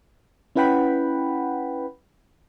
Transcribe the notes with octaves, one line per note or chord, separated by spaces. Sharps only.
C#4 E4 B4 F#5 G5 B5